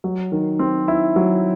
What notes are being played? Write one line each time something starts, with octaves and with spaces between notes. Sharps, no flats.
F#3
D#3
C4
E4
F#3